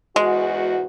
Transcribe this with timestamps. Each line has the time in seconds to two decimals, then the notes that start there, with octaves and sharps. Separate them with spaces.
0.16 E2 G#2 G#3 F#4